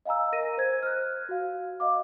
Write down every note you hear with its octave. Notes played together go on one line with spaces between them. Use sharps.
D#5 F5 G#5 A#5 E6
A#4 A#6 D#7
C5 G#6
F6 F#6
F#4 F5
D#5 F5 D6